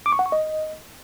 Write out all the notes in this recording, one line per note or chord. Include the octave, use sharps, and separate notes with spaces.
D6
C#6
F#5
C#6
D#5